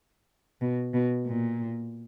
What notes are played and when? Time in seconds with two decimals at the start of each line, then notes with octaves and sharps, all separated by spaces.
0.61 B2
0.94 B2
1.26 A#2